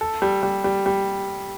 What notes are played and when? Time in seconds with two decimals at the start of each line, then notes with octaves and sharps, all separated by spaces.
0.01 A4
0.22 G3
0.43 G3
0.64 G3
0.86 G3